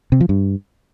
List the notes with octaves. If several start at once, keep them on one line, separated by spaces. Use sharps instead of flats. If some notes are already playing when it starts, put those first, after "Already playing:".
C3
F3
G2